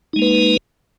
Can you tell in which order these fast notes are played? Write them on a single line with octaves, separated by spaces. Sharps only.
D#4 G#3 A#3 B4